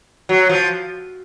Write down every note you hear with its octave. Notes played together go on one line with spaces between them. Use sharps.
F#3
F3